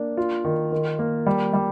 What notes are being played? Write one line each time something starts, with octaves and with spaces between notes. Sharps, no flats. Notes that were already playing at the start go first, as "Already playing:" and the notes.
Already playing: A#3 D4
F4
D#3
D#3
A#3
G3
G3